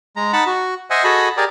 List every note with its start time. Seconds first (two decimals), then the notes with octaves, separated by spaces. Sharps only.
0.16 G#3 A#5
0.33 D#4 F#5 A5 B5
0.47 F#4
0.90 C5 D#5 E5 F#5 G#5
1.04 F#4 G#4 A4 D#5 B5
1.37 G4 G#4 A#4 D5